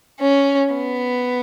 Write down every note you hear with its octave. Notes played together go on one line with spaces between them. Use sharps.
C#4
B3